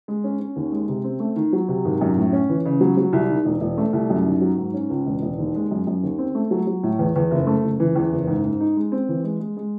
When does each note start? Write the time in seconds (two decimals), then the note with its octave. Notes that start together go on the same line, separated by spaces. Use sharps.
0.08 G#3
0.24 C#4
0.40 C#4
0.56 D#2
0.72 G#3
0.89 C3
1.04 C4
1.20 A3
1.36 D#3
1.53 F#3
1.68 C3
1.85 G#1
2.01 F#2
2.16 A2
2.33 C#4
2.49 E3
2.65 C#3
2.80 F#3
2.97 F#3
3.13 C2
3.29 D#3
3.45 E1
3.61 E1
3.78 A3
3.93 C2
4.10 F#2
4.26 D#3
4.41 F#3
4.57 G#2
4.74 C#4
4.90 C#2
5.06 E1
5.22 E1
5.38 D#2
5.55 G#3
5.71 F#2
5.87 F#2
6.03 D#2
6.18 C4
6.35 A3
6.51 F#3
6.67 F#3
6.83 A2
6.99 E2
7.16 E2
7.31 F#1
7.47 A3
7.64 F#1
7.80 E3
7.96 E2
8.12 F#1
8.27 G#2
8.44 G#2
8.60 D#4
8.77 G#3
8.92 C4
9.09 E3
9.24 G#3
9.40 G#3
9.57 G#3